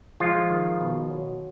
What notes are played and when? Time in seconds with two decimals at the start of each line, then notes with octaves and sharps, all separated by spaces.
0.20 F3 G#3 F4
0.50 D#3
0.81 B2
1.10 F#3